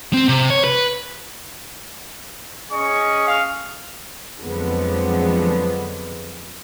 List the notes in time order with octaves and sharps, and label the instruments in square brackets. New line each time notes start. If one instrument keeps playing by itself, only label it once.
[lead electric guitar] C4
C3
C#5
B4
[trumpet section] C#4 G#4 D#5 [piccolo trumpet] C#6
[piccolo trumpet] F5
[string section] F2 D3 F3 F#3 G#3 B3